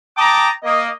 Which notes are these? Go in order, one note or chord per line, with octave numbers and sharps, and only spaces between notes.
G5 A5 A#5 D6 D#6
A#3 D#5